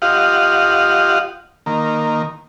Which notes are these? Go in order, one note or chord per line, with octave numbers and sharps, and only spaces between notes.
F4 G4 D#5 F5 F#5
D#3 A#3